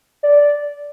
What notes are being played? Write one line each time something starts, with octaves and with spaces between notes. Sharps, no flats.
D5